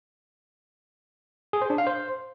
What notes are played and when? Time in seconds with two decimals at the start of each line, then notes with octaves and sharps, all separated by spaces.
1.53 G#4
1.62 C5
1.70 D4
1.78 F5
1.87 C5